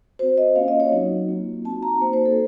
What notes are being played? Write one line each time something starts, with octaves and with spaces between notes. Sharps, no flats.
C4 F#4 C5
D#5
A#3 C#4 F4 F5
D#5
C#5
F#3 C4 D#4 F#4
A#3 F4
C4 D#4 F#4 A5
A#5
A#3 D#4 F#4 C5
C5
A4